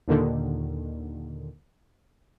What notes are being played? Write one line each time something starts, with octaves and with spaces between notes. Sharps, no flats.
D#2 A#2 D3 D#3